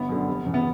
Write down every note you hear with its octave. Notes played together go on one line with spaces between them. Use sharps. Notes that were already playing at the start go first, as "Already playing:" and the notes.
Already playing: G1 B3
F#2 D3
F1
E2 C#3
B3